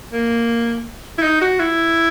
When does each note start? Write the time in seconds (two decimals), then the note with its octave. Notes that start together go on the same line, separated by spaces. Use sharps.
0.12 A#3
1.18 E4
1.22 D#4
1.41 F#4
1.60 E4